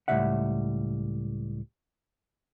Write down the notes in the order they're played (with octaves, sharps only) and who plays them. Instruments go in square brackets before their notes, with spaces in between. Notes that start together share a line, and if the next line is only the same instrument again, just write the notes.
[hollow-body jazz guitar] C#2 A2 C3 G3 E5 F#5